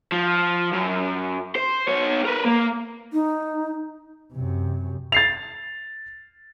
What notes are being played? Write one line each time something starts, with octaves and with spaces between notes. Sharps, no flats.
F3
F#2
C5
B3 C#5
A#4 B4
A#3
D#4
F#2 C3
A6 C7 F7